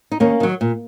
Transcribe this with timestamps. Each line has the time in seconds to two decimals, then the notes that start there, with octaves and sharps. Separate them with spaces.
0.12 D#4
0.20 D#2 A#3 C#4
0.40 D#3 F#3
0.61 A#2